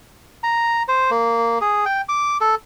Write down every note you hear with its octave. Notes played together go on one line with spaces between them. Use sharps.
A#5
C5
A#3
G#4
G5
D6
A4